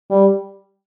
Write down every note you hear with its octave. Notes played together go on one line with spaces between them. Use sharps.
G3